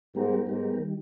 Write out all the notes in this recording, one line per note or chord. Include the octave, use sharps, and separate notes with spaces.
G#2 G3 B3 G4 A#4
G#2 G3 B3 G4 A#4
D#3 G3